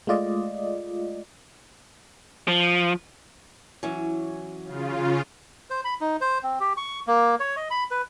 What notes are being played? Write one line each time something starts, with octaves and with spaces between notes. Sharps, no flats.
G#3 A3 F4 D5 D#5
F3
E3 F#3 C#4
C#3 F4
C5
B5
D#4
C5
C4
G4
C#6
A#3
C#5
D#5
B5
B4